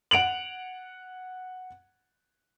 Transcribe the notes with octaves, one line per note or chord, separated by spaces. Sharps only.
F#5 D7 F7 F#7